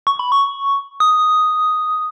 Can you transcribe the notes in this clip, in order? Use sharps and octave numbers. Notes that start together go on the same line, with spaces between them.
C#6
B5
C#6
D#6